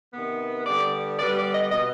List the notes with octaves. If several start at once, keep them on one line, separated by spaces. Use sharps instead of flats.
C3 D#3 B3
D3 G3 B3 D5
D3 G3 B3 D5
D5
D#5
B2 B3 D#5